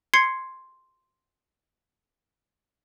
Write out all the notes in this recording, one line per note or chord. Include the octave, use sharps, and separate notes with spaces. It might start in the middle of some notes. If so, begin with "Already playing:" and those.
C6 G#6 C7 C#7